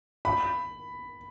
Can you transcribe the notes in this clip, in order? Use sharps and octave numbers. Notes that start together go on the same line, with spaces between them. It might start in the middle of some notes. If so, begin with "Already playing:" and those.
B5